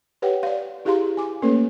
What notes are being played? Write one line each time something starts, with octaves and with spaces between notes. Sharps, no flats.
G4 B4 C#5 F#5 G5
D5 F5
E4 G4 G#4 F5 A#5 C6
G#5 D6
A3 A#3 C#4 A4 B4 C#5